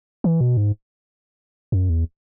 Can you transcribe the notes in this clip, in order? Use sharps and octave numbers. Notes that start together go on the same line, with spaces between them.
E3
B2
G#2
F#2
E2